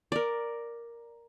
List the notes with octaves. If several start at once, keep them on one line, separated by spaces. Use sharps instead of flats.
A#4 D5